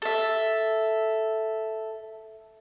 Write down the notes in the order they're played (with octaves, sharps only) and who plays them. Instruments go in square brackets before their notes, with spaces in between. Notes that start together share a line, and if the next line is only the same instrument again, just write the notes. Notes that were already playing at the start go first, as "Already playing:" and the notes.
[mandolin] A4 E5